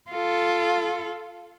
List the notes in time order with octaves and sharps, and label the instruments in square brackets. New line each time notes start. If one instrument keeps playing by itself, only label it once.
[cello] F4 A4